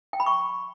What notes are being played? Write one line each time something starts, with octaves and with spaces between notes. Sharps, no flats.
G5
B5
C#6